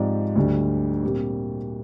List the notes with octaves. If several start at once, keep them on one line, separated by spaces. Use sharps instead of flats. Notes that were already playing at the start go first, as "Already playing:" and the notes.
Already playing: G#2 F3 C4 G4 D5
D2 D3 G3 D4
A#2 G3 C4 G4